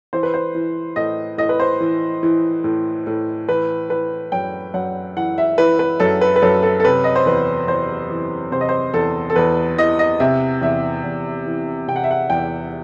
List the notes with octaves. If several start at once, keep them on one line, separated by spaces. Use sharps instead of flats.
E3 C5
B4
C5
E3
A2 D#5
A2 D#5
B4
C5
E3
E3
A2
A2
E3 B4
E3 B4
F#2 G5
F#2 F#5
E3 F#5
E5
E3 B4
B4
F#2 A4
B4
B4
F#2 A4
A4
A4
C3 B4
D#5
C5
E2 B4
E2 C5
E3
C3 C5
D#5
C5
E2 A4
A4
E2 B4
E3 D#5
D#5
C3 E5
E2 E5
E2
E3
C3 G5
F#5
E5
F#5
E2 G5